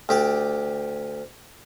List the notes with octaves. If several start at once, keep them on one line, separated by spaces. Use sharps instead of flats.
D2 G4 D5